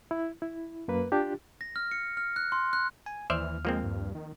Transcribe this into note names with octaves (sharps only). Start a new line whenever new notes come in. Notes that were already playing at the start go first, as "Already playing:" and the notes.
E4
E4
F#2 A#3 B4
D4 F4 G4
A#6
F6
C#7
F6
F#6
C6
F#6
G#5
D#2 E3 C5 D5 E5 F6
F3 G#3 A#3 C4
G2
D#3